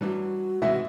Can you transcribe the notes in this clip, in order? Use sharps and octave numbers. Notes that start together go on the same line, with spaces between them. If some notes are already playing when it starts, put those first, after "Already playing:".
G2 E3 F#3 G3 F#4
G#2 C3 E3 G#3 D#5 E5 F#5